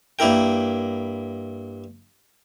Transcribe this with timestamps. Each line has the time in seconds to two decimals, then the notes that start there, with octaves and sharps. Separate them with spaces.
0.19 G2 A#3 E4 A#4 G5